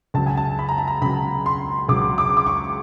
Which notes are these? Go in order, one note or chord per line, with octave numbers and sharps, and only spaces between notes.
C#2 C#3 F#3 A5
G#5
A5
B5
A#5
A5
A#5
C#2 C#3 F#3 B5
C6
C#2 C#3 F#3 D6
D6
D6
C#6